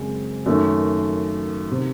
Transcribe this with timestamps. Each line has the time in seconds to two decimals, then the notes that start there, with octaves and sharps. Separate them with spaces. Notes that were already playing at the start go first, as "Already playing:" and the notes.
Already playing: F#2 C#3 G#3 C4
0.46 F#2 D#3 A3
1.71 C3 D#3